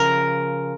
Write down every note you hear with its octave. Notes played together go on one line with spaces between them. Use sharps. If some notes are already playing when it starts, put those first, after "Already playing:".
Already playing: C#3 F3 A#4